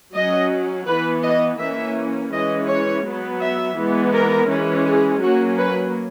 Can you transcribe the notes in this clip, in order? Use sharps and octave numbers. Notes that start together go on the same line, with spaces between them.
F#3 C#4 D#5
E3 B3 B4
D#5
E3 A#3 C#4 E5
E3 G#3 C#4 D#5
C#5
F#3 B3
E5
E3 G#3 B3
A#4
E3 G#3 C#4
G#4
F#3 A#3 C#4 F#4
B4